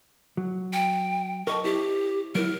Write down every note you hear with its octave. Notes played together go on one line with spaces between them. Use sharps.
F#3
G5
A#4 D#5 A5 C#6
E4 G4 C5
F#3 E4 A#4